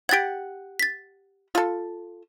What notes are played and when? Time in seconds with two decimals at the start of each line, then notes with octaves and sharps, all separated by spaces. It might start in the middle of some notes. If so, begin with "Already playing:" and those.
0.09 G4 F#5 G#6 A6 D7
0.79 A6 B6
1.55 F4 A4